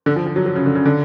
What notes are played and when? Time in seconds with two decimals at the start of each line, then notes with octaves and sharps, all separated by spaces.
0.06 D3
0.16 F3
0.26 F3
0.36 F#3
0.46 F#3
0.55 C#3
0.66 D3
0.75 C#3
0.86 D3